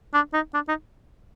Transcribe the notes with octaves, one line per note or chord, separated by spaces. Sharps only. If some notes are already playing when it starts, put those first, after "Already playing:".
D4
D#4
D4
D#4